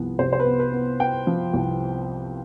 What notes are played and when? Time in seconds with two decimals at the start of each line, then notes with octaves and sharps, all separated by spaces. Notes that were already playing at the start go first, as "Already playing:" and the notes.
Already playing: C2 F3 B3
0.19 C3 C5
0.33 C5
0.40 B4
0.46 B3
0.60 B4
0.73 B3
1.00 B3 G5
1.27 F3
1.53 C2